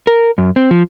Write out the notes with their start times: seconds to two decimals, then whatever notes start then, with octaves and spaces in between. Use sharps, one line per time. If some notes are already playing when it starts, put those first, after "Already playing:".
0.07 A#4
0.38 F#2
0.56 C4
0.71 F3